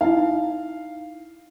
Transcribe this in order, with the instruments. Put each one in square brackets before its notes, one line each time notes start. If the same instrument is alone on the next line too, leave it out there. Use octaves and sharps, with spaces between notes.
[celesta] D#4 E4 [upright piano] F5